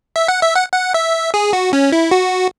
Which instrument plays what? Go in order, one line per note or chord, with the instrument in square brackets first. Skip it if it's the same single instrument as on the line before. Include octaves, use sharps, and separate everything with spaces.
[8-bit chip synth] E5
F#5
E5
F#5
F#5
E5
G#4
F#4
C#4
E4
F#4